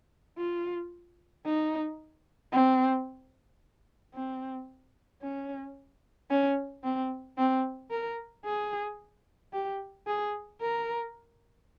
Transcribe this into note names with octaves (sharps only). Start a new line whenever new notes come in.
F4
D#4
C4
C4
C#4
C#4
C4
C4
A#4
G#4
G4
G#4
A#4